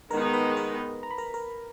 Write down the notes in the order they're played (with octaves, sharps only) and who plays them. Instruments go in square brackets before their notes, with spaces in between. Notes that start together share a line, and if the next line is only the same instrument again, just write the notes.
[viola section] D#3 G#3 B3 D#4 [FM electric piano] A#4 A#5
[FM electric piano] B4 B5
A#4 A#5
A#5
B5
A#4 A#5
A#4 A#5